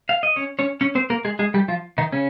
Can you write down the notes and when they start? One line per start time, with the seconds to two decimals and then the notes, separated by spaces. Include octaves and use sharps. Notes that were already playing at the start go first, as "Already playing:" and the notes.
0.09 F5
0.23 D#5
0.36 C#4 C#5
0.59 C#4 C#5
0.81 C#4 C#5
0.95 C4 C5
1.10 A#3 A#4
1.25 G#3 G#4
1.39 G#3 G#4
1.54 G3 G4
1.68 F3 F4
1.98 D#3 D#4
2.12 C#3 C#4